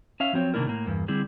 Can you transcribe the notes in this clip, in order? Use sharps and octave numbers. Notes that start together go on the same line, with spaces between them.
C#4 E5 F5
F3 F#3 C4 C#5
C3 D#3 A#3 D4 E4 A#4
A2 A#3
E2 G2 A#3
D3 G3 C4 E4 G#4